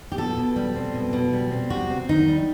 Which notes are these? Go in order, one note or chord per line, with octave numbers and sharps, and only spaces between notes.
G4
B2 A4
B2
G3
C4
B2
B2
G3
C4
C3 F#4
C4
D#3 D#4
G3